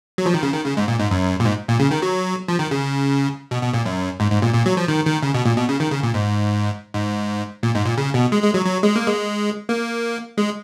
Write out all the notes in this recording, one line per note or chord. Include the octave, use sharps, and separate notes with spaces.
F#3
F3
D#3
C#3
D#3
C#3
G#2
A#2
G#2
F#2
A#2
G#2
A#2
C#3
D#3
F#3
F3
D#3
C#3
B2
B2
A#2
F#2
G#2
G#2
A#2
A#2
F#3
F3
D#3
D#3
C#3
B2
A#2
B2
C#3
D#3
C#3
A#2
G#2
G#2
A#2
G#2
A#2
C#3
B2
G#3
G#3
F#3
F#3
G#3
A#3
G#3
A#3
G#3